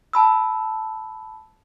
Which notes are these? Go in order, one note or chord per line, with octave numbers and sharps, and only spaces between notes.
A5 B5 E6